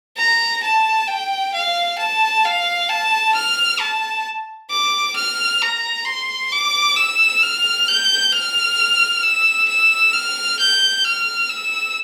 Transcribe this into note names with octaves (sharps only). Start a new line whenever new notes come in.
A#5
A5
G5
F5
A5
F5
A5
F6
A5
D6
F6
A#5
C6
D6
E6
F6
G6
F6
E6
E6
F6
G6
F6
E6